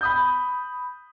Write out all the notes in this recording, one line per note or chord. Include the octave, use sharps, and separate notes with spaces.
B5 D#6 G6